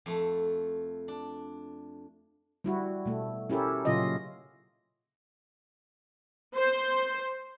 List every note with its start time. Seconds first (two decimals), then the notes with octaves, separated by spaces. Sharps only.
0.06 F2 A3
1.08 D4
2.64 G3 E4 F#4
3.06 B2 A3
3.50 C#4 E4 G4 A4 A#4
3.85 A#2 C#3 F#3 C#4 F4 D#5
6.56 C5